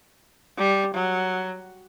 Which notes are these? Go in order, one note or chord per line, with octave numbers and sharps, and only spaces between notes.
G3
F#3